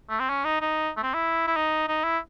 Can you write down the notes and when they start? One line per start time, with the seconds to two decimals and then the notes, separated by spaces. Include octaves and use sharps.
0.10 A3
0.20 C4
0.29 C#4
0.45 D#4
0.61 D#4
0.97 A3
1.03 C4
1.14 E4
1.47 E4
1.56 D#4
1.88 D#4
2.04 E4